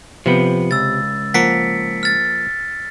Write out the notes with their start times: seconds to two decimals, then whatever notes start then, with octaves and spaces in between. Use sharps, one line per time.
0.26 C3 F3 B3
0.71 C#2 E6 A6
1.34 F3 A#3 F#5 B6 C#7 D7
2.03 F6 A6